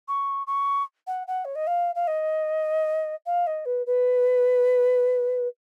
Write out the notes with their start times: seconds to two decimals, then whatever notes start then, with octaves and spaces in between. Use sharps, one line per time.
0.08 C#6
0.47 C#6
1.07 F#5
1.27 F#5
1.45 C#5
1.55 D#5
1.67 F5
1.95 F5
2.07 D#5
3.26 F5
3.47 D#5
3.66 B4
3.86 B4